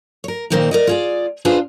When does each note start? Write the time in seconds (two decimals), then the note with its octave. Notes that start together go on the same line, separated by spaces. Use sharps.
0.24 A#4 C#5
0.50 A#2 D#3 A#3 C4 D#4 A#4
0.71 A#4 D5 D#5
0.87 F4 G#4 D5
1.45 D4 E4 F4 G#4 B4 C5